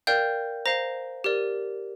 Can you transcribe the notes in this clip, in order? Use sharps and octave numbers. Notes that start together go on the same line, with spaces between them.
A#4 D5 F5 G5 G6
C5 F5 A#5 A#6
G4 A#4 D5